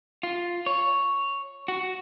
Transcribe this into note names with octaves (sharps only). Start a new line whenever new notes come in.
F4
C#5
F#4